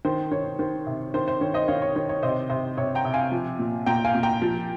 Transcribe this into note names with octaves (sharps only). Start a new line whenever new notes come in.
D#3 C5
D#3 C#5
D#3 C5
C3
D#3 C5
C5
D#3 C#5
C5 D#5
D#3 C#5 F5
C#5
D#3 C#5
C#5
C3 C5 D#5
C3 C5
C3 C#5
G5 A#5
C3
F5 G#5
F3
A#2
A#2 G5 A#5
F5 G#5
A#2
G5 A#5
F3